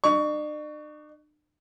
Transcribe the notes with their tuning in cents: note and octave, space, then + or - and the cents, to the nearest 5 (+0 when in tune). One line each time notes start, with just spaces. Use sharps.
D4 +45 C#6 +20